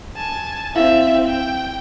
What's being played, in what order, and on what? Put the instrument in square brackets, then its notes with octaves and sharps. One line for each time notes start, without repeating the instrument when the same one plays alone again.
[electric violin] G#5 A5
[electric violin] C4 E5 [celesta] E4 F5
[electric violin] G5